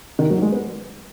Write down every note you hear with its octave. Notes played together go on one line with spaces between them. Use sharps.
D#3
F#3
G#3
B3